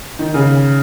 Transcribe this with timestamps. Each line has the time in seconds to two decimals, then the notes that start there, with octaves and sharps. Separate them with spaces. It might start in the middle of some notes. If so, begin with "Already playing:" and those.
0.19 D#3
0.34 C#3